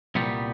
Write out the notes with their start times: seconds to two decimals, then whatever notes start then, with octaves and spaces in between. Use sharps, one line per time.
0.15 C2 A#2 G3 B3